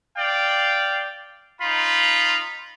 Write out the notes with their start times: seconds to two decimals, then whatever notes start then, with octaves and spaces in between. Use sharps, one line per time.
0.16 D5 F5 G5
1.61 D#4 F4 B5